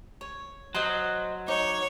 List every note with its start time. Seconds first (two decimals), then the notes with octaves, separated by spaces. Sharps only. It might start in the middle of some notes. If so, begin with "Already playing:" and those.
0.21 C#5
0.75 F#3 C5 D#5 C6
1.48 D#4 C#5 D6